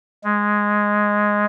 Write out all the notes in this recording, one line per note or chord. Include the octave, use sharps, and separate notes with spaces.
G#3